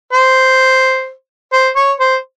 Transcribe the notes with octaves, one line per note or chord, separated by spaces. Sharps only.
C5
C5
C#5
C5